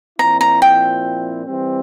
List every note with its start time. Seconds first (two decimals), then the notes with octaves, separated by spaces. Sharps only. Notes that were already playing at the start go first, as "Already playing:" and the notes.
0.19 A#2 F3 C4 E4 A#5
0.41 A#5
0.62 G5
1.46 E3 G3 C4